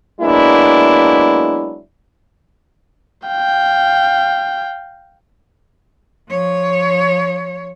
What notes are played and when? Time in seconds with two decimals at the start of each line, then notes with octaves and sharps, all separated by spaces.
0.21 F#3 G#3 A#3 B3 D4 E4
3.28 F5 G5
6.30 F3 C#5